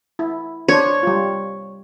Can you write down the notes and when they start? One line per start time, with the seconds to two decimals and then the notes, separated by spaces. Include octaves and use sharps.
0.19 E4
0.68 D4 C5 C#5
1.03 G3 F4